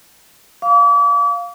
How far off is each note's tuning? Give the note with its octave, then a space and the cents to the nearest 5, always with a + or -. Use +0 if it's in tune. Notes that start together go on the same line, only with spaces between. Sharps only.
F5 +0 D6 -40